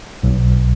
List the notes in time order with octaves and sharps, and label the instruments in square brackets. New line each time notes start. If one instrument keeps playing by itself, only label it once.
[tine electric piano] B1